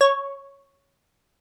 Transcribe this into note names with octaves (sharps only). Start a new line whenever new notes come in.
C#5